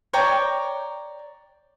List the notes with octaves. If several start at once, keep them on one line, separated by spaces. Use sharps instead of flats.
C#5 D5 G5 A#5